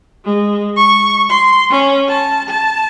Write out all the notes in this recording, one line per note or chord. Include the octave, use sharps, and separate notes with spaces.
G#3
C#6
C6
C#4
A5
A5